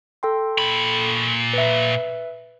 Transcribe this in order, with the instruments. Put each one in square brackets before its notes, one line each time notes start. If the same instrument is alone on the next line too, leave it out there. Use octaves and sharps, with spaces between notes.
[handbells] A4 G5 C6
[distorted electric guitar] A#2 B5
[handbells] B4 E5